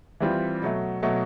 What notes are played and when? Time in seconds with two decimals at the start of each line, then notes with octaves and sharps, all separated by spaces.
0.20 E3 G3 C4 F4
0.62 B2 F#3 A3
1.03 B2 F#3 A3